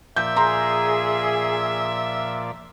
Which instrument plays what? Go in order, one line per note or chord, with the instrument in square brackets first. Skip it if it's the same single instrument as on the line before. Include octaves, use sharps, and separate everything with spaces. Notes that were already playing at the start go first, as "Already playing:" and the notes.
[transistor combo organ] A#2 F3 D5 [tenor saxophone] E5 [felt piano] G6
[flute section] G#4 [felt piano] A#5 C6